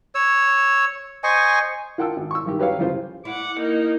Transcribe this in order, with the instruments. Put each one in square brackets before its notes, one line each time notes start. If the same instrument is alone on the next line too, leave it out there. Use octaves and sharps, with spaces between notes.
[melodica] C#5 E6
C5 D#5 G#5 C#6
[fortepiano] F4 A#4 F#5 G5 A5 E6
G#1
C#6 E6
G2 D#3 G4
F#3 G4 B4 C#5 F5
E2 G2 C#3 F4 G4 C5
[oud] E4 [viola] F#5 D6
[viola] A#3 D#4